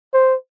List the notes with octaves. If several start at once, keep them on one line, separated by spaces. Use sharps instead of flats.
C5